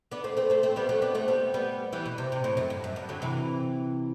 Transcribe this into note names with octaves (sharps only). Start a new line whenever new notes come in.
B3 D4
A3 C4
A3 C4
A3 C4
A3 C4
G3 B3
F#3 A3
B3 D4
A3 C4
G3 B3
G3 B3
E3 G3
B2
C3
C3
A2
F#2
G2
F#2
G2
D3 F#3
C3 E3